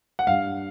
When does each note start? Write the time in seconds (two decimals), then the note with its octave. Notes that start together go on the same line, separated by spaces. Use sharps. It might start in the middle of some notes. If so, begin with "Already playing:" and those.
0.19 F#5
0.27 G2 F5